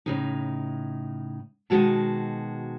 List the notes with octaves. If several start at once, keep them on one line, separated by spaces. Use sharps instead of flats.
A2 C#3 D#4
B2 D#3 F#3 G#3 F#4 A5